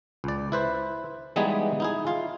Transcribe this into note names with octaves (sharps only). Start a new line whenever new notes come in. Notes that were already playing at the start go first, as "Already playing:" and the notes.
C#2 D5
E4 B4 C5
E3 G3 G#3 B3 D#4 G#4
D#4 E4 G#4
F4 F5